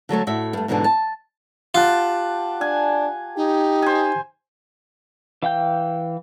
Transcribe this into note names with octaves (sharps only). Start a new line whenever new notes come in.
D3 F#3 A3 C#5
A2 F#4 E5
G2 A3
G#2 B2 D3 E3 D4
A5
F4 G4 F#5 A5
D4 G#5
D#4 G4
C5 G#5
E3 F5 G5 G6